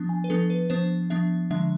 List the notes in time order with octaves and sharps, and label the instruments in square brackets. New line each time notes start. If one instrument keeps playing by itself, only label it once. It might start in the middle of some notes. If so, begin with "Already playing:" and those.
Already playing: [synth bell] F3 B3 D4
G#5
B4
F3 B3 D4 A4
B4
F3 B3 D4 C5
F3 B3 D4 E5
D3 F3 G#3 D4 E5